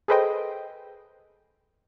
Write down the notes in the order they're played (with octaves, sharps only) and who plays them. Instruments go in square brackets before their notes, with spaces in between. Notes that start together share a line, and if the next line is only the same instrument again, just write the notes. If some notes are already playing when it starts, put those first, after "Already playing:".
[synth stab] G#4 A4 B4 C5 D#5 G5